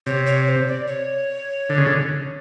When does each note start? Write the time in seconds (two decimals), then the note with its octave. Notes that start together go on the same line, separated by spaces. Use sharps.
0.06 C3 C#5
0.26 C#5
0.47 C5
0.67 D5
0.88 C#5
1.70 D3
1.78 C#3
1.87 D3